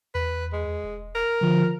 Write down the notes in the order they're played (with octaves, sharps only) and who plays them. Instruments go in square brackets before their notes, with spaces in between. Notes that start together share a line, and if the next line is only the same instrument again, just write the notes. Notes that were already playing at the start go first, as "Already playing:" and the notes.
[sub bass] E2 [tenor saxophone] B4
[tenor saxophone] G#3
[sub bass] E1
[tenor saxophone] A#4
[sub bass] D3 [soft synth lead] F3